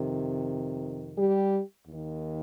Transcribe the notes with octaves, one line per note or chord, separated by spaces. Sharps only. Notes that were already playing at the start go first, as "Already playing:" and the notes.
Already playing: F2 C3 D#3
G3 G4
D#2
D#3